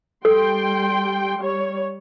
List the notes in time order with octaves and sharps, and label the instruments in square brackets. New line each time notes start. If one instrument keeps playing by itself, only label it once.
[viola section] G3 G5 C6 [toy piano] A4
[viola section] G3 C#5